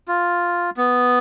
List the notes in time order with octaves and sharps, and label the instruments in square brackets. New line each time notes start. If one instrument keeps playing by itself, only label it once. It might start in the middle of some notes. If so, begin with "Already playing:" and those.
[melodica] F4
B3